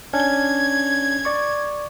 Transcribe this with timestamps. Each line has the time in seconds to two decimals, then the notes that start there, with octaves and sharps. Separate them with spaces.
0.13 C#4 D4 G#6
1.25 D5 C#6